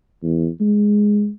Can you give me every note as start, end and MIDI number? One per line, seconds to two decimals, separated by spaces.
0.23 0.49 40
0.61 1.30 56